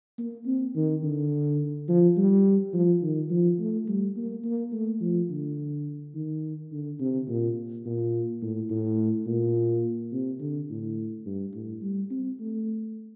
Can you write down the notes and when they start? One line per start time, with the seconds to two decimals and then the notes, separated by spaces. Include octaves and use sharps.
0.18 A#3
0.46 C4
0.75 D#3
1.03 D3
1.88 F3
2.17 G3
2.73 F3
3.03 D#3
3.30 F3
3.59 A3
3.88 G3
4.16 A#3
4.44 A#3
4.73 A3
5.01 F3
5.30 D3
6.15 D#3
6.72 D3
7.00 C3
7.28 A#2
7.85 A#2
8.42 A2
8.70 A2
9.27 A#2
10.12 C3
10.40 D3
10.70 A2
11.26 G2
11.54 A2
11.82 G3
12.11 C4
12.40 A3